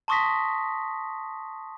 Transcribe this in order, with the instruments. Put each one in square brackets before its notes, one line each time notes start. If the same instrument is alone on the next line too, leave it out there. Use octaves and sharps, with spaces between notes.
[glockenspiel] A5 C6 C#6 D#6 A#6 B6